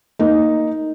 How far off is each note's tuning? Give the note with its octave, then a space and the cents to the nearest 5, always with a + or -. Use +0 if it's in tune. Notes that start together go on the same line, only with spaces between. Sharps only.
A#3 -10 D#4 +0